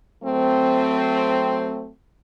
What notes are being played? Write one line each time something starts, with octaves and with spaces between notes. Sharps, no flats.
F#3 A3 C4